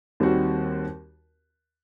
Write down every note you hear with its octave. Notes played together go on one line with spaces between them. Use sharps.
D#2 D#3 G3 C4 F#4